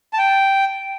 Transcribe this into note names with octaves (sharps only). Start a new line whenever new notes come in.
A5
G5